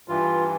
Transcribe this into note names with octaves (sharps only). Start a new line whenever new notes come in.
G2 E3 F4